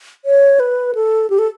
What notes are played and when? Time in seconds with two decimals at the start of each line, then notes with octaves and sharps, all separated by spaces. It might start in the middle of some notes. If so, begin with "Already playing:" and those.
0.25 C#5
0.60 B4
0.95 A4
1.30 G4
1.39 A4